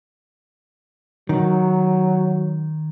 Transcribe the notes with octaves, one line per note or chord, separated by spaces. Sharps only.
D#3 F#3